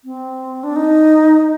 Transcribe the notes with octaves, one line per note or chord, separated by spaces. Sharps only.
C4
D4
D#4